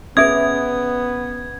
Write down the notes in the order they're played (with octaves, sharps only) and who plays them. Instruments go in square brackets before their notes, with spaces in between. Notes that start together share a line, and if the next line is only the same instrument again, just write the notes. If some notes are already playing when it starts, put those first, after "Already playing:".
[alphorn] B3 [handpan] C#4 B4 [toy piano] G#4 E5 D#6 [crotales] G#6